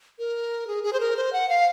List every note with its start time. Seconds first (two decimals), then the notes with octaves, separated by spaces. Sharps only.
0.19 A#4
0.67 G#4
0.84 G#4
0.93 C5
1.00 A#4
1.16 C5
1.33 F#5
1.49 F5